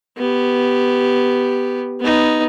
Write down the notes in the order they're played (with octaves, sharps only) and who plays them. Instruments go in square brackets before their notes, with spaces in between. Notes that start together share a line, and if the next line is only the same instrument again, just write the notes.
[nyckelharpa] B3 G4
B3 D#4